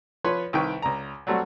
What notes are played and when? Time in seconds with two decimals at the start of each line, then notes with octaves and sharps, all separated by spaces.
0.24 F3 B4 C#5 B5 C6
0.53 C2 D#3 B4 G5 C#6
0.82 C#2 A#5
1.27 F#3 G3 A3 C4 F#4